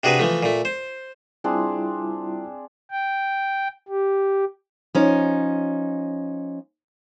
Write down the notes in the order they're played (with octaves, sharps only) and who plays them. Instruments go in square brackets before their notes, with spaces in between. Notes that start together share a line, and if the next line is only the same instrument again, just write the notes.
[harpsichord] C3 D4 F#4 G#4 B4
E3 F3 A3
A#2 A3
C5
[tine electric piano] G3 E4 F4 [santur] C4 D4 G#4
[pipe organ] G5
G4
[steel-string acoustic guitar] F3 C#4 D#4